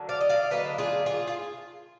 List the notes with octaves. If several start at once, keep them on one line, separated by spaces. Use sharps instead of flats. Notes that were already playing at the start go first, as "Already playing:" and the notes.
Already playing: D3 F#3 A#3
D5 F5
D#5
D5 F5
D3 F#3 A#3 B4 D#5
F4 G#4
F4 G#4
F4